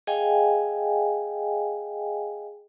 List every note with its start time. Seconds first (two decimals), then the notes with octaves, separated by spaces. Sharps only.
0.07 G#4 D#5 F5 G5 G#5